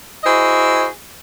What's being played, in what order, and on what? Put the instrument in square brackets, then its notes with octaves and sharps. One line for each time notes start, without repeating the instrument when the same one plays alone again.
[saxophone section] E4 F#4 G#4 C5 D#5